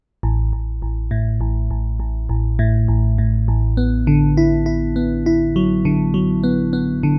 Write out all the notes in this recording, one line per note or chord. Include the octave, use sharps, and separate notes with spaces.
A1
A1
A1
A2
A1
A1
A1
A1
A2
A1
A2
A1
B3
D3
E4
E4
B3
E4
F#3
D3
F#3
B3
B3
D3